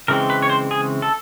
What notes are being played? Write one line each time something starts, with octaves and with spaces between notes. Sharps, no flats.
C#3 E3 G#3 C4 A#4
B4
C#5
C5
G#4
A4